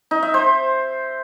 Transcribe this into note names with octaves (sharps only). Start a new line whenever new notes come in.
D#4
E5
C5